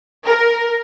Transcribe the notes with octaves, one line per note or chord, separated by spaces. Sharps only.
A#4